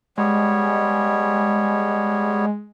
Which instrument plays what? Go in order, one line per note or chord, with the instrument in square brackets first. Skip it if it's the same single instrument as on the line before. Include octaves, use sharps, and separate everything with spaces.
[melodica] G3 B3 C#5 [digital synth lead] G#3